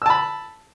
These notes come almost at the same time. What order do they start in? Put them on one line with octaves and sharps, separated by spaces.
E6 A5 B5